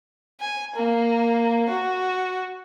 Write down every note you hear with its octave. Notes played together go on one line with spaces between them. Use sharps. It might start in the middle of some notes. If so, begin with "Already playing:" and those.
G#5
A#3
F#4